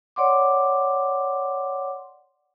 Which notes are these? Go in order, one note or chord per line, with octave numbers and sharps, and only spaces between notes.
C#5 D5 F#5 C6 D6